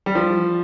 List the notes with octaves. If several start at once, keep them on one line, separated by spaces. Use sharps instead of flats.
G3
F3